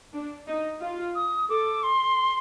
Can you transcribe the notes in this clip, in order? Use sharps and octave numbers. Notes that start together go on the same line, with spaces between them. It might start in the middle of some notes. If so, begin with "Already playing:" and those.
D4
D#4
F4
D#6
A4 D6
C6